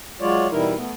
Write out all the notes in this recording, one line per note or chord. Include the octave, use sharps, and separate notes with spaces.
F#3 G#3 F4 C#5 D5
B2 E3 G3 D#4 E4 A#4
A3 B3